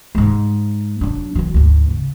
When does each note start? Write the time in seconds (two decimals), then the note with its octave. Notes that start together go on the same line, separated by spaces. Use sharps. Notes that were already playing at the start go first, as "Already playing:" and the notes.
0.15 G#2 G#3
1.01 F#3 D4
1.35 E3 F#3
1.54 D2 G#2
1.90 C#3